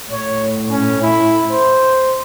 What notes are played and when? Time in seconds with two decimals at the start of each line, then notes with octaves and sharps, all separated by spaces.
0.11 A2 C#5
0.70 C#4
1.02 E4
1.51 C5